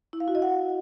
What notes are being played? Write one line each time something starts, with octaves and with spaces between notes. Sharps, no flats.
E4
F5
F#4
D#5
F#5